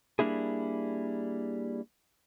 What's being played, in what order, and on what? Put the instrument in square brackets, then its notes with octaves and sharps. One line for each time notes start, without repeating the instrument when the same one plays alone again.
[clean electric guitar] G3 A#3 D4 E4 G#4